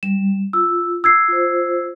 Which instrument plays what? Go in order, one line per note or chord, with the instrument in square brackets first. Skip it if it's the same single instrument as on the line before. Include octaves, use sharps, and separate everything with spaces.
[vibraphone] G3 [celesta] E7
[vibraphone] F4 [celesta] E6
[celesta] E6 G#6 C7
[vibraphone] F4 C5